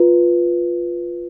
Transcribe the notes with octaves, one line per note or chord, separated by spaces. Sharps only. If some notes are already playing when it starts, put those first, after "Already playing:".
Already playing: F4 B4